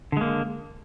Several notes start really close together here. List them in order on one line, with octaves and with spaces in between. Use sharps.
D3 G#3 A#3